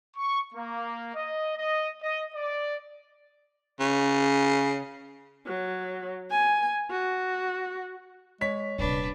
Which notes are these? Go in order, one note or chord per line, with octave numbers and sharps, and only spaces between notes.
C#6
A#3
D#5
D#5
D#5
D5
C#3
F#3
G#5
F#4
G#3 C#5 B6
D#1 C3 G3 D4 B4